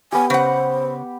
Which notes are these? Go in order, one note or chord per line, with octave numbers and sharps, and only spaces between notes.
B3 G4 G#5
C#3 C5 F#5